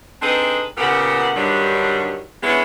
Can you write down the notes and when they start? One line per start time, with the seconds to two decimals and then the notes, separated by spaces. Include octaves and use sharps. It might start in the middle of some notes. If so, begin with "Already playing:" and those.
0.22 C4 D4 D#4 G#4 A4 B4
0.77 A#2 C#3 B3 G4 A#4 F#5
1.34 G2 D3 D#3 F#3 G3
2.43 G#3 B3 C#4 D4 E4